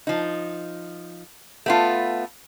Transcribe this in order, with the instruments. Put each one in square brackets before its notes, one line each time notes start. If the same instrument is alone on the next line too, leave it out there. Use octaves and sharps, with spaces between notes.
[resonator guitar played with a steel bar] F3 D#4
A3 B3 F4